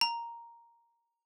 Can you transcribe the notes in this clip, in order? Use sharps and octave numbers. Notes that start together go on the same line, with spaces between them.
A#5